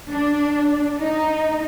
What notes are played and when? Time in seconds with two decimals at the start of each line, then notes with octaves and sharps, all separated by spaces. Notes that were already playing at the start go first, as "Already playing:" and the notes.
0.11 D4
0.99 D#4